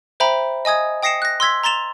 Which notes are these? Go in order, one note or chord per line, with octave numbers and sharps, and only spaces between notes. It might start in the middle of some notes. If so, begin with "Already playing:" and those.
C5 E5 G5 A#5 B5
D#5 G#5 D#6 G#6
G5 D#6 A#6 C7 C#7 E7
F#6 A#6
C6 E6 G#6 B6
A#5 C6 A6 E7 F7